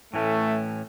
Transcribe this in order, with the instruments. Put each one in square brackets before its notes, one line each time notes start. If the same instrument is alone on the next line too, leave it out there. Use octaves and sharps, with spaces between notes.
[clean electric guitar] A2 E3 C#4 [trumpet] A3